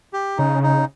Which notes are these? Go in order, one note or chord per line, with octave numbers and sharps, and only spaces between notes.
G4
C#3 D#4
D#4